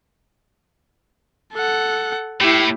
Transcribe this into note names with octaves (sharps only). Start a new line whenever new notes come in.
A4 F#5
A2 E4 G4